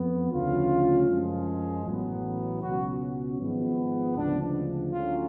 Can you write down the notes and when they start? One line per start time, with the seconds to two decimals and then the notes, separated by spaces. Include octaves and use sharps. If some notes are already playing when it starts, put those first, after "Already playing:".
Already playing: F2 F3 B3
0.31 D2 C#3 F3 A3 C#4 F4
1.08 F#2 F3 G#3
1.85 A1 A2 F#3 B3
2.62 C#2 B2 F#3 C#4 F#4
3.39 G#1 G#2 F3 G#3 B3
4.15 D2 C#3 F3 G#3 D4
4.92 D2 D3 F#3 C#4 F4